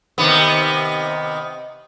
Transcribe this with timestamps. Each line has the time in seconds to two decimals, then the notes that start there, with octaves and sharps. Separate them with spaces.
0.18 C3 D#3 B3